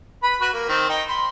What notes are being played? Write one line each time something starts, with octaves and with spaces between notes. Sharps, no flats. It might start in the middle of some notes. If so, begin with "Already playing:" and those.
B4 B5
F#4 B4
A#3
D#3 C4
D#4 G5
B5 C6